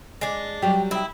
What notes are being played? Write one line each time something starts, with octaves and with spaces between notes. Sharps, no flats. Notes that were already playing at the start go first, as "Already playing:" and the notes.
G#3 D4
F#3 G3 G4
D#4 E4 G5